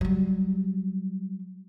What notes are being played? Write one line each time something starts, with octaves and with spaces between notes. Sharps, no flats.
F#3 G3